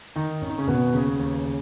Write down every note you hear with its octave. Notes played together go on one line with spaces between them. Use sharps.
D#3 D#4
G#1 C#4
D#4
C#3 C#4
G#1 B2 B3
D#2 C#3 C#4
D#2
C#3